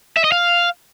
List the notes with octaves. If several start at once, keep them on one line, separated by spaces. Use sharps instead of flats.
E5
D#5
F5